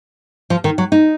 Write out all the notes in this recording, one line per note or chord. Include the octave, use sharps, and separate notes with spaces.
F3
D#3
F#3
D#4